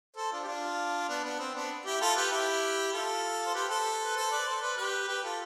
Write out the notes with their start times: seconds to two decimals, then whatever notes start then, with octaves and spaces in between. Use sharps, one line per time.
0.16 A4 C5
0.32 D4 F4
0.43 G4
0.47 D4 F4
1.09 B3 D4
1.24 B3 D4
1.39 C4
1.55 B3 D4
1.85 E4 G4
2.01 F4 A4
2.16 G4 B4
2.31 E4 G4
2.93 F4 A4
3.46 C5
3.54 G4 B4
3.69 A4 C5
4.05 B4
4.16 A4 C5
4.31 B4 D5
4.46 A4 C5
4.62 B4 D5
4.77 G4 B4
5.08 G4 B4
5.23 F4 A4